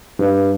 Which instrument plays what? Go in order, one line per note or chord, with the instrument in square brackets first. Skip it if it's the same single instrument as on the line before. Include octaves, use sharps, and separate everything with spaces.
[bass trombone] G2